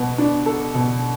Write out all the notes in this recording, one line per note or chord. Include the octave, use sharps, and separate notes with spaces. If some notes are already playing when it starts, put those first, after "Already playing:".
Already playing: B2 B3
D4
A4
B2